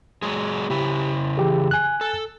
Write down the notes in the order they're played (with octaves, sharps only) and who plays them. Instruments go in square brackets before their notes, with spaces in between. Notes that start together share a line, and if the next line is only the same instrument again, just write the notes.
[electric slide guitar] F#3 G#3 G#4
[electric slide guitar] C#3 E4 [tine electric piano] G4
[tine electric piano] E3 G4 G#4
G#5 F#6
[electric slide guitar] A4